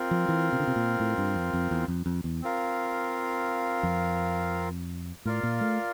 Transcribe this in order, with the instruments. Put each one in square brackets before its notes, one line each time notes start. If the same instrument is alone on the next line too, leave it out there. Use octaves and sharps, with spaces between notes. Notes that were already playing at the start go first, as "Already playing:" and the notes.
Already playing: [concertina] C4 F4 A#4
[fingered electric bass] F3
E3
C3
D3
C3
A#2
A2
G2
F2
F2
E2
F2
F2
E2
[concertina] C4 F4 A#4 F5
[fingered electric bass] F2
[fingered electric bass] A2 [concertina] F4 A#4 D5 F5
[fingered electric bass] A#2
A3